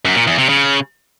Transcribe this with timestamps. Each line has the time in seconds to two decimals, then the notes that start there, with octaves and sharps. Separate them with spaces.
0.05 F#2
0.16 A#2
0.27 E2
0.38 C3
0.49 C#3